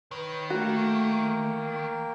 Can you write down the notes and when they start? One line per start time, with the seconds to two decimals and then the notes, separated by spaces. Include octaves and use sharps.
0.11 D#3 B4 C#5
0.50 A3 A#3 F#4 A#4 G5